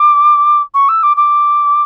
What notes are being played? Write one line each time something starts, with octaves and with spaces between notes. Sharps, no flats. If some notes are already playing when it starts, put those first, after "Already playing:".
Already playing: D6
C#6
E6
D6
D6